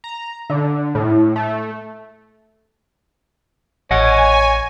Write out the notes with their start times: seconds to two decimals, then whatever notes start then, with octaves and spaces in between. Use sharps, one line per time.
0.04 A#5
0.50 D3
0.95 A2
1.36 A3
3.91 A1 C#5 D#5 F#5 G#5